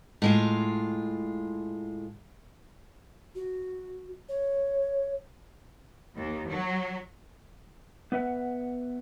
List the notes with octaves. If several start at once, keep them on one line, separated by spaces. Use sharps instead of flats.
A2 G#3 F4
F#4
C#5
D#2
F#3
B3 B4 E5 F#5